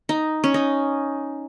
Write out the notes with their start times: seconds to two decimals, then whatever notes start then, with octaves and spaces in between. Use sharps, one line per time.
0.09 D#4
0.44 C#4
0.54 D#4